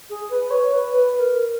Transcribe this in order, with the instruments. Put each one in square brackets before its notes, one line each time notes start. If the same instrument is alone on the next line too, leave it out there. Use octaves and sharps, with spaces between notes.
[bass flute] G#4
B4
C#5
B4
B4
A#4